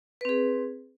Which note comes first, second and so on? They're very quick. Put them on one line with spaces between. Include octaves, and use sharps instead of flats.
B4 C4 G#4